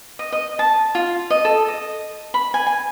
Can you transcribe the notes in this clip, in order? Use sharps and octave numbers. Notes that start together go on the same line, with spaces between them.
D#5
D#5
A5
F4
D#5
A4
D#5
B5
G#5
G#5